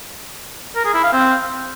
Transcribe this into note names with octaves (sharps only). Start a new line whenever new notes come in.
A#4
G#4
E4
F5
C4